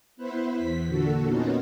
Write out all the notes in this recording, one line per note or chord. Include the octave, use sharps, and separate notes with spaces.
B3 E4 B4 C5
E2 B6
A#2 D3 F#4 A4
A#3 B3 C#4 D#4 F4 F#4